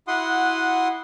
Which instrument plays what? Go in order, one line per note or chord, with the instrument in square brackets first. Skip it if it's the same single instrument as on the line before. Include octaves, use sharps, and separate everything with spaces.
[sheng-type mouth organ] E4 F#4 F#5 C6 D#6